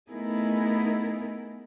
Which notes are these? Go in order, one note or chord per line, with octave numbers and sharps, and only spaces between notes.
A3 B3 D#4 E4 G#4 A#4